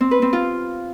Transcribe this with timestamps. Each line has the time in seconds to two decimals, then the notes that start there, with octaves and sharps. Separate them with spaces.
0.01 C4
0.11 B4
0.22 C4
0.33 F4